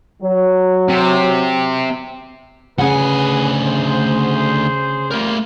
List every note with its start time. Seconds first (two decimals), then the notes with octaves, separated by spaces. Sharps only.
0.23 F#3
0.89 C3
2.78 D2 C#3 G#4 B4 F#5 G#5
3.66 G#4 C5
5.11 G3 A3 A#3 F4 A#4